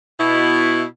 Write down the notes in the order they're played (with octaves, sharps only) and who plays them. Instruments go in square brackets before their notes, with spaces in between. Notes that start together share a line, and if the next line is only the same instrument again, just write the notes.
[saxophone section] B2 E4